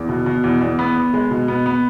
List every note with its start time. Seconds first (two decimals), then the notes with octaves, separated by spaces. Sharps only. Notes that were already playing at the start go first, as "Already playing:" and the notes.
Already playing: E2
0.09 B2
0.26 B2
0.44 E2
0.61 E2
0.79 B3
0.96 B3
1.14 G#3
1.31 B2
1.48 B3
1.66 B3